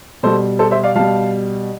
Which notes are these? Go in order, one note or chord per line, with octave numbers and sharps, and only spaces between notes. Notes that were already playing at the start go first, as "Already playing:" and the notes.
B2 G3 A4 C5
A4 C5
C5 E5
D5 F5
B2 G3 F5 A5